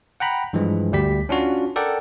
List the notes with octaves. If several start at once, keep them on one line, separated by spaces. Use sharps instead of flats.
F#5 G5 A#5 B5
G2 E3 F3 G#3
D2 G3 G4 B6
C#4 D4 F4 F#4
A4 A#4 D5 F#5 G5